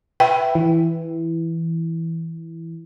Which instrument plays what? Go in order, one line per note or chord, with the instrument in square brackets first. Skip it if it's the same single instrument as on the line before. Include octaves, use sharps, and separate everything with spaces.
[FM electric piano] B4 E5 [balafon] G5
[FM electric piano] E3